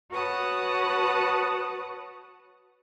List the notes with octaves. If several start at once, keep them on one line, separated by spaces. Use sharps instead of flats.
F#4 B4 C#5 F#5 A5 D#6